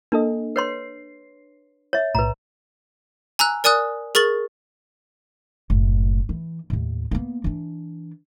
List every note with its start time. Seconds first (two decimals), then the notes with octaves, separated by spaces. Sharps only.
0.12 A#3 D4 A4 D#5
0.56 B4 C#5 C6 C7
1.93 C#5 E5
2.15 B1 A2 B4 A#5
3.39 G#5 A#5 E6 F#6
3.64 A#4 D5 G#5 D#6 F#6
4.15 G#4 A#4 C#6 A6 F#7
5.70 F#1 A2
6.29 E3
6.70 D#2 A2
7.11 A#3 B3
7.44 E3 D4